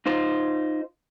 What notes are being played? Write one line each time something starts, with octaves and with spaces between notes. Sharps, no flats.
D#4 F4 C5